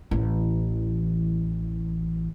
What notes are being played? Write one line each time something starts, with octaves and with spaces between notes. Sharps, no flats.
A1 E3